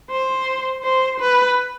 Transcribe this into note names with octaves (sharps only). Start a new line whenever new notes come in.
C5
C5
B4